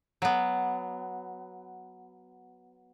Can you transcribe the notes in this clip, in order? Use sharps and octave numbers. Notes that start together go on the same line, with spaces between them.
F#3 B3